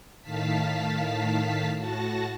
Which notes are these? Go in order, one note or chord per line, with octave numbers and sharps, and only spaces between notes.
A2 D#3 F5 A5 B6
A2 F#4 A5 A#6